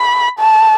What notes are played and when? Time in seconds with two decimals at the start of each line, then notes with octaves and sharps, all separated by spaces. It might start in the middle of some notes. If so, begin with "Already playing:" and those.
Already playing: B5
0.39 A5